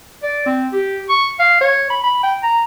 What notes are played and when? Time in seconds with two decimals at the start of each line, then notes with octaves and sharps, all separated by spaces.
0.23 D5
0.46 C4
0.72 G4
1.09 C#6
1.39 F5
1.61 C#5
1.90 B5
2.03 B5
2.23 G5
2.43 A#5